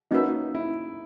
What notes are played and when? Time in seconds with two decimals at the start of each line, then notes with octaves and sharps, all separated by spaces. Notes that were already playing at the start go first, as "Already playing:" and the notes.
0.11 A#3 C#4 D#4 F#4 B4 E5
0.55 E4